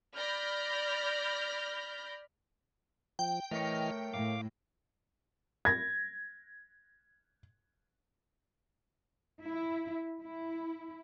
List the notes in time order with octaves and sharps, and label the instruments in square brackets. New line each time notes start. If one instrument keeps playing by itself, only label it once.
[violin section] D5 B5 F6 G6 A#6
[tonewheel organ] F3 [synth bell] G5
[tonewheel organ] E3 D#5 F6 [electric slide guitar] A3 A#4 C#5
[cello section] A2 [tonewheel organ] F5 D6
[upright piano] G#6 A#6
[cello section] E4
E4